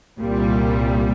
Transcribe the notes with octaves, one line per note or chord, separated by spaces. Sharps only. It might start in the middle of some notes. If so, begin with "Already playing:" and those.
C2 A#2 G3